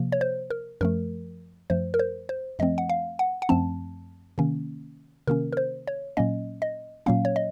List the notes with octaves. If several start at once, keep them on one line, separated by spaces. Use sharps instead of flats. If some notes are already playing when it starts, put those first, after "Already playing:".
Already playing: C3 F3 A#3
C#5
C5
A#4
F#2 F3 A3 A#4
F#2 F3 A3 C5
A#4
C5
C5
F#2 F3 A3 C4 D#5
F#5
F5
F#5
F#5
F#2 F3 A3 C4 A5
C3 D#3 A#3 C#4
C3 D#3 A#3 C#4 A#4
A#4
C5
C#5
A#2 F#3 A#3 C#4 D#5
D#5
A#2 F#3 A#3 C#4 F5
C#5
D#5